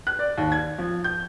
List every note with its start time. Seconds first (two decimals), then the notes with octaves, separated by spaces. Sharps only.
0.07 F#6
0.19 D5
0.38 D#2
0.52 G#6
0.78 F3
1.04 G6